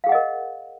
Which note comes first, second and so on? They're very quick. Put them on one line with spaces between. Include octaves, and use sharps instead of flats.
F5 G#4 F#5 D#5 A#4